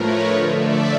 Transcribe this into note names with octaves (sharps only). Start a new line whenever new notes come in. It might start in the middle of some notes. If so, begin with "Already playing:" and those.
Already playing: A2 F3 A3 A#4 B4 C#5
D3 F3 A3 C#5 D#5
D5 E5